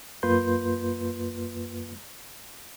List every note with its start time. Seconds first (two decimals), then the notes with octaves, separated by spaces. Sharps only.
0.23 F#2 A#3 F4 B4 C6 G6